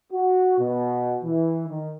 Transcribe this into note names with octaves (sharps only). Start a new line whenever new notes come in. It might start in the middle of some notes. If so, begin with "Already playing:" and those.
F#4
B2
E3
D#3